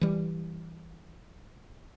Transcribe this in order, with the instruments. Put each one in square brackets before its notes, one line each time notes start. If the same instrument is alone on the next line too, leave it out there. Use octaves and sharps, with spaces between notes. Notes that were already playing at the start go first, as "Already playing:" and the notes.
[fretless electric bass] E3 G3